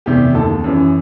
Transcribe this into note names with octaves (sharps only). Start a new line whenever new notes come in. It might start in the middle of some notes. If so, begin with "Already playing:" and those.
E2 C3 D#3 G4
D#2 D#3 A4
F#2 E3